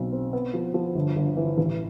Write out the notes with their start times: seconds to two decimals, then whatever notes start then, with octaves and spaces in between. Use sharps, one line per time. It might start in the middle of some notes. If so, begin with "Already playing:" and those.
Already playing: B1 C4
0.12 C4
0.33 B3
0.54 F3
0.74 F3
0.95 G1
1.16 G1
1.37 E3
1.58 A1